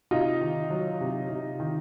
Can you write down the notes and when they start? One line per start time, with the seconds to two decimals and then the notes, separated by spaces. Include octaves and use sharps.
0.11 C3 D#4 F4
0.41 D#3
0.70 F#3
1.00 C3
1.30 C3
1.60 D#3